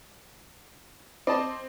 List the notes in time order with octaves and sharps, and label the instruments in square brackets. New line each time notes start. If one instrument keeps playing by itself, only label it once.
[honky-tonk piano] C4 [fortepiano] D5 D#5 A5